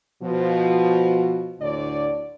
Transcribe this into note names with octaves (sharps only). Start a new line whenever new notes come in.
B2 F3
D2 A2 D3 C#5 D5